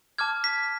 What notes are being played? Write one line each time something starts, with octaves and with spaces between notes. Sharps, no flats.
A5 D6 F6 G#6
B6